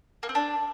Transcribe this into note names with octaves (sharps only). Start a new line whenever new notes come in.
A#3
C4
D4